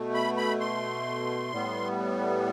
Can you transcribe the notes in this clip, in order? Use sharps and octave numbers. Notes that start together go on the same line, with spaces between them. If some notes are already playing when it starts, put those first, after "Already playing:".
Already playing: B2 A3
B5
B5
C6
A2 G3 B3